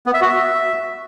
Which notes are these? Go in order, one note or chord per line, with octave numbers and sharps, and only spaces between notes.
B3
E5
F#4
E5